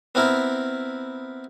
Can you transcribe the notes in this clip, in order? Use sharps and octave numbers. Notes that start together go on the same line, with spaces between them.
B3 C4 E4 A#4